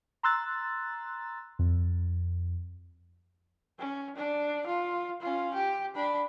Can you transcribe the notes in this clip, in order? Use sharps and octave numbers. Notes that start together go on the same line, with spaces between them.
A#5 C6 E6 F#6 A6
F2
C#4
D4
F4
C#4 F4
G4
D4 B5